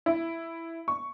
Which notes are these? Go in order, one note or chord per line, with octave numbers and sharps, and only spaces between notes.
E4
C#6